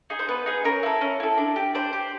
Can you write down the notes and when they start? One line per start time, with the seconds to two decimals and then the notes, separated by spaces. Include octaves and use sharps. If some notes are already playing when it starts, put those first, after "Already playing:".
0.10 D#4 G#4
0.19 C5
0.29 B3 B4
0.46 D#4 G#4
0.65 C#4 A#4
0.83 E4 A4
1.01 C#4
1.20 E4 A4
1.38 D4
1.56 G4
1.75 D4 C5
1.93 G4